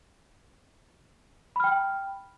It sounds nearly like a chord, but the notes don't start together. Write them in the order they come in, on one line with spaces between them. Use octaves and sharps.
B5 F6 G5